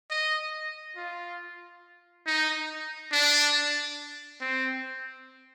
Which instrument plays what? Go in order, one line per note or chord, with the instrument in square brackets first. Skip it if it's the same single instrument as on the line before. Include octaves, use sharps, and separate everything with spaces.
[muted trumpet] D#5
F4
D#4
D4
C4